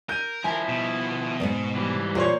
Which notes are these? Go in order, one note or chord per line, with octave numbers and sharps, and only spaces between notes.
A#4 G6 D#7
F3 E4 G#5
B2
E2 G#2
E3 G3
A#2 A#3 C5 C#5